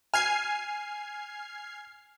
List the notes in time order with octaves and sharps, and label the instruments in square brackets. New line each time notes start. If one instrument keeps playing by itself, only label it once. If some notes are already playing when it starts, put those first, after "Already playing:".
[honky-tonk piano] G#5 [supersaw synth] F6 G#6 C7